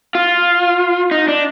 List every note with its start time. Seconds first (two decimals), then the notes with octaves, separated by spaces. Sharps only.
0.15 F4
1.11 D#4
1.28 D4